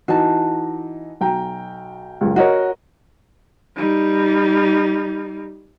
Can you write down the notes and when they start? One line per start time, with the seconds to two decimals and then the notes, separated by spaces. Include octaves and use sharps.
0.08 E3 D#4 F#4 A5
1.21 B1 G5 A#5
2.21 F#1 C#2
2.36 F#4 A#4 C#5 D#5 F#5
3.76 G3 D#4